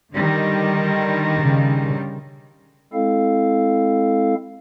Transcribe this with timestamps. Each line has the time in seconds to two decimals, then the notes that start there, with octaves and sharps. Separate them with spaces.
0.15 D3 D#3 G3
1.38 C#3
2.93 G#3 C4 E4 A4 F5